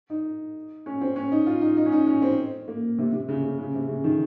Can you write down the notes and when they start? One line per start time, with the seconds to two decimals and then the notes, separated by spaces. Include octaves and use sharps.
0.10 D#4
0.86 C#4
1.01 C4
1.16 C#4
1.32 D#4
1.46 F4
1.61 D#4
1.77 D#4
1.86 C#4
1.92 D#4
2.07 C#4
2.22 C4
2.68 A#3
2.98 C3
3.12 C3
3.29 C#3
3.43 C#3
3.58 C#3
3.74 C3
3.88 C#3
4.04 D#3